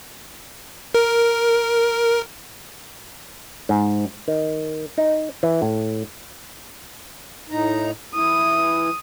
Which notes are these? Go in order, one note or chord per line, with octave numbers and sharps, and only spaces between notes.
A#4
G#2
D#3
D#4
E3
A2
A2 D#4 A#5
E3 E4 D#6